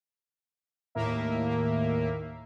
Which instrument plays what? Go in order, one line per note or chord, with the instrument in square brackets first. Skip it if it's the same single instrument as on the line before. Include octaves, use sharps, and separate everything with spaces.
[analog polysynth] D#2 A2 A#3 E5